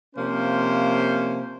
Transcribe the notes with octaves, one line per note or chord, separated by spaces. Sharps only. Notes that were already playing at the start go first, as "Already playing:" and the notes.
C3 F3 A#3 C#4 C5 F5